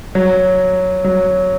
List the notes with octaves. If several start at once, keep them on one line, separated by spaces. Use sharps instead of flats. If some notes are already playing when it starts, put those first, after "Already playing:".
F#3
F#3